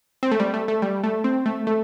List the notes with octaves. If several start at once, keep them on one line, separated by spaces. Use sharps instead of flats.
C4
A3
G3
A3
A3
G3
A3
C4
A3
A3